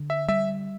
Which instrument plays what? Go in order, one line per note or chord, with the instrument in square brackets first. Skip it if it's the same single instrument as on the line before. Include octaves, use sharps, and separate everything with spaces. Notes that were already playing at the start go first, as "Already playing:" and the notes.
Already playing: [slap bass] D3
[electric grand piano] E5
[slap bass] G3 [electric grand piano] E5